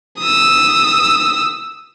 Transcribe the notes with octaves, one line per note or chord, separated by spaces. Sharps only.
D#6 E6